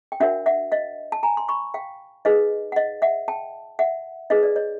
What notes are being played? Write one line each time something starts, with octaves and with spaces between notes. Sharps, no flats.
G5
D4 F#4 A#4 C#5 E5 F#5
E5 F#5
D#5 F5
A5
G#5 A#5
C6
B5 C#6
F5 G5
D#4 G#4 B4 D#5 F5
F#5
D#5 F5
E5 F#5
G5 A5
E5 F#5
D#4 G#4 B4 D#5 F5
D5
C#5 D#5